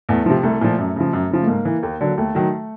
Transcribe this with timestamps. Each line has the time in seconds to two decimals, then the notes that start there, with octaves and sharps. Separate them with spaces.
0.09 E2 A3
0.26 C3 F3
0.43 C2 A3
0.61 A#2 F3
0.78 F#2
0.96 C#3 F3
1.13 F#2
1.31 C#3 F3
1.42 A3
1.47 G#2 A#3
1.65 E3
1.83 D#2
2.01 D3 F#3
2.18 D#2 A3
2.35 D#3 F#3